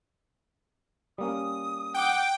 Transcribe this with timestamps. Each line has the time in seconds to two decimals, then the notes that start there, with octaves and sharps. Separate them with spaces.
1.18 G3 A#3 C#4 D#6
1.94 F#5 G5 D6